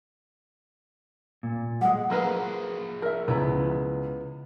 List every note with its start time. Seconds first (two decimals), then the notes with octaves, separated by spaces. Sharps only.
1.43 A#2
1.81 G3 G#3 F#5
2.10 F3 F#3 A#3 G#4 B4
3.02 A#4 E5
3.28 C#2 B3 E4 A#5